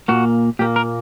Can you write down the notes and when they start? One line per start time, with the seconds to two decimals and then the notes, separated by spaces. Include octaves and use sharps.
0.08 A#2 A#3 F#4
0.59 A#2 A#3 G4
0.76 A#4